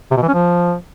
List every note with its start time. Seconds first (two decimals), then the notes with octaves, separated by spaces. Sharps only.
0.11 C3
0.17 B2
0.23 E3
0.28 C#4
0.34 F3